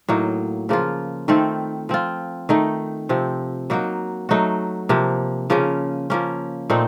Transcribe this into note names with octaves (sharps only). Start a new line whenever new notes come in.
A2 F#3 A#3 D#4
C#3 F3 A#3 F4
D#3 A3 C4 F4
F3 C4 F4
D#3 A3 D#4
C3 F3 C4
F#3 A#3 D#4 F#4
F#3 A3 D#4 F#4
C3 F3 A#3
C#3 F3 A#3 C#4
F3 A#3 C#4
A#2 A3 C4 D#4